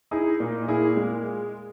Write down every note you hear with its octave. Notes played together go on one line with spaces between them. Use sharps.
D#4 E4 G#4
A#2
A#2 E4 G#4
G#3